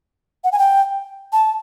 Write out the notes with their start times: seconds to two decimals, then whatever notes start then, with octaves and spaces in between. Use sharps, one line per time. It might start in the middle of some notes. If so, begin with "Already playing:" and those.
0.44 F#5
0.52 G#5
0.59 G5
1.33 A5